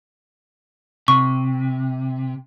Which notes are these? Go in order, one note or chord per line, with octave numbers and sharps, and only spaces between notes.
C3 C#6